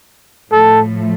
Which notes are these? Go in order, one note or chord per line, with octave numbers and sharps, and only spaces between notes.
A2 F3 A3 A4